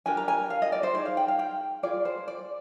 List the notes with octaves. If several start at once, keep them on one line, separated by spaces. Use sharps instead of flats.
D4 G4 A#4 G#5
A#5
G#5
F5
D#5
D5
C5
D#4 G#4 D5
F5
G5
F5
G5
F4 G#4 D5
C5
D5